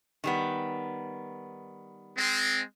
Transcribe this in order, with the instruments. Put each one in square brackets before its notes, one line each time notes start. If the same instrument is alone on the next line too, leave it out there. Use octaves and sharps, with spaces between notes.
[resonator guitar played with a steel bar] D#3 G3 B3
[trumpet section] G#3 C4